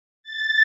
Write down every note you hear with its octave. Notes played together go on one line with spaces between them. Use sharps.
A6